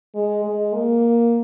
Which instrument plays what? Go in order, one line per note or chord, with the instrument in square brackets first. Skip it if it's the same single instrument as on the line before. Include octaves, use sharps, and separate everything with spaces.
[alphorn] G#3
G#3
A#3